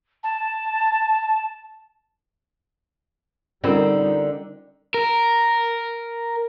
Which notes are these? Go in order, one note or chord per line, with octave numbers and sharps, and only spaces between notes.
A5
D3 G3 C4 C#4 D#4 F4 A#4
A#4